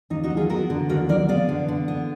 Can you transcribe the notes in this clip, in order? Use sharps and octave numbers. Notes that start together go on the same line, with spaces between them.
D#2 D#4
D#4 F#4
F#3
F4 G#4
B3 F#4 A#4
D3
D#2 F#4 A#4
F#3 A#4 D5
B3 D5 F5
D3
D3
B3